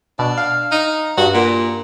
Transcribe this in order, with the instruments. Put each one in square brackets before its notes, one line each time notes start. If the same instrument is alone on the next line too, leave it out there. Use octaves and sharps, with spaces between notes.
[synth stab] B2 [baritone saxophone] D4
[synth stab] F5
[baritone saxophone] D#4
[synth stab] G2 [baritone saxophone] F#4
[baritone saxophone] A#2